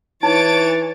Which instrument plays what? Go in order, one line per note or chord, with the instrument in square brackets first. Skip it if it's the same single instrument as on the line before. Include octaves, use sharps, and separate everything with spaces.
[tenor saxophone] E3 [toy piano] D#4 [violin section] C#5 A6 D7